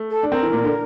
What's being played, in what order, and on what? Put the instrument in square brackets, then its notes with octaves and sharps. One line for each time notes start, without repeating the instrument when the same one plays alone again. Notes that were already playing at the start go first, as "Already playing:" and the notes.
Already playing: [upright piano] A3
[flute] A4
[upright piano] D4
[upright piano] C4 [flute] A#4
[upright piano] E3
A#2
D3